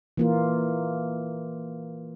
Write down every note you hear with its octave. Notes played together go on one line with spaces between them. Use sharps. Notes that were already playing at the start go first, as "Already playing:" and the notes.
E3 A#3 F4